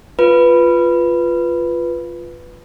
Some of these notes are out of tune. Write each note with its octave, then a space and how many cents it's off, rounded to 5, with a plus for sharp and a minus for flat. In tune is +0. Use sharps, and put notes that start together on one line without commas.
F4 +0 B4 +0